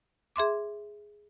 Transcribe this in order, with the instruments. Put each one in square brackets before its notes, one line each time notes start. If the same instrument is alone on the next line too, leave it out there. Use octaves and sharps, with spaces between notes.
[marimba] G#4 E5 C6 D6